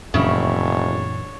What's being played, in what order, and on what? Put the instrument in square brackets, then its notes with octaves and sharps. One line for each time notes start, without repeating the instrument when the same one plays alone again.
[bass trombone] F1 [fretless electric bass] F#2 A#2 E3 [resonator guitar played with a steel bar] C#3 E4 [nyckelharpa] D4 C#5